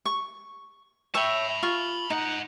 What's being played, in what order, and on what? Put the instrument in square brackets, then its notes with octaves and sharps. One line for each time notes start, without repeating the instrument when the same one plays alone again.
[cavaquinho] C#6
[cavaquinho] C#5 E5 G5 [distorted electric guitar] A5 B5
[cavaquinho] F4 C#6
[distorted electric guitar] G#2 F#5 [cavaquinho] D#4